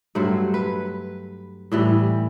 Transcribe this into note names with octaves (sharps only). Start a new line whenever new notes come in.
G2 F#3 A3 C5
B4
A2 E3 G3